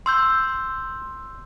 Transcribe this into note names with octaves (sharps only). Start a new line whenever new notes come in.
C6 E6 G6